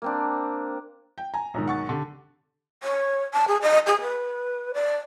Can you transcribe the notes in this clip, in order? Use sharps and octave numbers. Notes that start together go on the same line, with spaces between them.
A#3 C4 D4
G5
G#5 A#5
B1 G#2 D#3
F#5 C#6 A6
D3 G4
C#5
A5
G#4
D#5
G#4
B4
D5